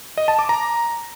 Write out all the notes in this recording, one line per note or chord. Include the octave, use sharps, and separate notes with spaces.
D#5
A5
D6
A#5